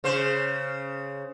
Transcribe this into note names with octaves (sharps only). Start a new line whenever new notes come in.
C#3 C5